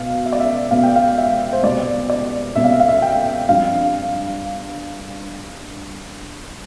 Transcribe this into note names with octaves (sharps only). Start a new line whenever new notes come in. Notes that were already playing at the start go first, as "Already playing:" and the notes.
Already playing: B2 B3 F5
E5
D5
E5
B2 B3 F5
G5
F5
E5
C5
C2 B2 B3 D5
D5
C2 B2 B3 E5
F5
E5
F5
E5
G5
G2 F3 C4 F5